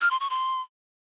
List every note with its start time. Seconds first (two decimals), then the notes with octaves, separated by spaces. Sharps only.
0.01 F6
0.11 C6
0.20 C#6
0.30 C6